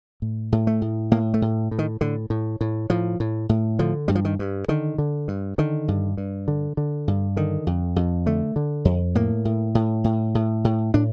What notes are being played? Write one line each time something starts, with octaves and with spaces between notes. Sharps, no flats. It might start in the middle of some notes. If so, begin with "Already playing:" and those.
A2
A2
A3
A2
A2 A#3
A3
A2
A2
D#3
A2 D3
A2
A2
A2 F3
A2
A2
D3 F3
G2 G3
F3
D#3
G2
D3 D#3
D3
G2
D3 D#3
G2
G2
D3
D3
G2
D3 D#3
F2
F2
D3 A3
D3
F2
A2 A#3
A2
A2
A2
A2
A2
A2 D4